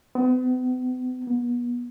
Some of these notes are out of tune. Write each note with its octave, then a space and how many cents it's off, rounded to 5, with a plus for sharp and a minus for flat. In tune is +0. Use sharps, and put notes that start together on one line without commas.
B3 +40
B3 -35